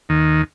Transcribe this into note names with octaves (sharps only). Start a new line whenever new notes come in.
D#2 D#3